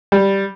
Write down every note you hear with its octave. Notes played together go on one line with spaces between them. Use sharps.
G3